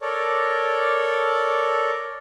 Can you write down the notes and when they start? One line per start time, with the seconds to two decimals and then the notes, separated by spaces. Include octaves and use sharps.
0.01 A4 A#4 C#5 D5